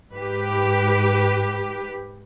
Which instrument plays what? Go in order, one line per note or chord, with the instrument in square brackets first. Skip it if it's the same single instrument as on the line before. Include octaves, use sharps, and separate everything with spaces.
[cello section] G#2 G4 B4